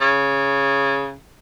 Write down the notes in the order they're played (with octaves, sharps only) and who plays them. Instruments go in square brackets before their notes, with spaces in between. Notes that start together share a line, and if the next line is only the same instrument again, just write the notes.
[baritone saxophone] C#3